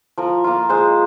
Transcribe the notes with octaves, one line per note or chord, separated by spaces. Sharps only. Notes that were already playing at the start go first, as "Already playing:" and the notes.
F3 A#4
A#3 F4
G#3 C5